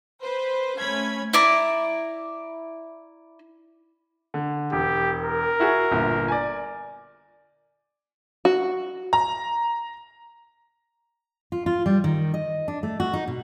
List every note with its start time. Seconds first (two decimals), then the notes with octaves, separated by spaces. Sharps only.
0.22 B4 C5
0.80 A3 C#4 B5 G#6
1.33 E4 D5 A#5
4.34 D3
4.72 E1 G4
5.22 A#4
5.60 E4 F#4 G#4
5.91 G1 A#2
6.28 D5 G#5
8.45 F#4
9.13 A#5
11.52 F4
11.66 F4
11.86 G3
12.04 D#3
12.34 D#5
12.68 D4
12.83 A3
13.00 F#4
13.13 D#4
13.27 B2